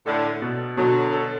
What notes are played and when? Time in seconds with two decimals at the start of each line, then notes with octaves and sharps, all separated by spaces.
0.06 A2 D3 A4
0.42 B2
0.77 B2 D3 F#3
1.13 A4